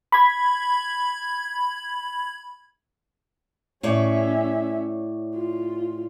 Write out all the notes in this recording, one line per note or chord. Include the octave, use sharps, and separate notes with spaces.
B5 G#6
A2 C#4 C#5 D5 E5
F4